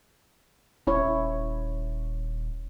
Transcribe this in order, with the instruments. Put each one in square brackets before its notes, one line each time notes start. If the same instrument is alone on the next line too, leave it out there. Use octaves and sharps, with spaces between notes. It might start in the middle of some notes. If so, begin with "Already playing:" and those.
[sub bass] D#1 [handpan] C#4 E4 C#5